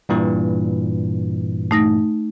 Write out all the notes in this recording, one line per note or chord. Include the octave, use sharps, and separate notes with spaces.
G2 A#2 E3
A3 D#4 A#6